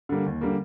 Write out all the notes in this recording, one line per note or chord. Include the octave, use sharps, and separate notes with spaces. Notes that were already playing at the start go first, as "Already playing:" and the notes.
D3 G3 A#3
D#2
D3 G3 A#3